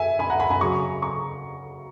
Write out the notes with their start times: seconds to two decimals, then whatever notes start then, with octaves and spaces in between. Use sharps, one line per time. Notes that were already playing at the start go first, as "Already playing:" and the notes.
Already playing: E5 G#5
0.19 G#5 B5
0.30 F#5 A#5
0.40 G#5 B5
0.50 G#5 B5
0.61 C#3 F#3 A#5 C#6
1.02 A#5 C#6